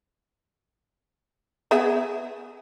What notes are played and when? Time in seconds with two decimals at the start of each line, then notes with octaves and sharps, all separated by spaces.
1.71 B3 G#4 E5